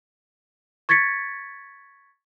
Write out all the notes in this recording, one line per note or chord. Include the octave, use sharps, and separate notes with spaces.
C#6 G#6 A6 B6 C#7